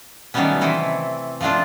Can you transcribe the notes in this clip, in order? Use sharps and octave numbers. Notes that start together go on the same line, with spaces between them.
D#3 F#3 G3 A3 B3 C#4
C3 E3 C4 E4 A4
F3 A3 C4 D4 F4